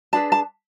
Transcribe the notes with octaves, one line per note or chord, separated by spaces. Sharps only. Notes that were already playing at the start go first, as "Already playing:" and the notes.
D4 G#4 B4 A5
A5